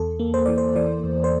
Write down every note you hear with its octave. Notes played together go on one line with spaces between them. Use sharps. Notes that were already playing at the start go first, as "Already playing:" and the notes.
Already playing: E2 A4
A#3
C5
E3 D5
C5
E3 D5
E2
C5